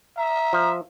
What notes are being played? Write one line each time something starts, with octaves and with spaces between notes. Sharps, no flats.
E5 A#5
F3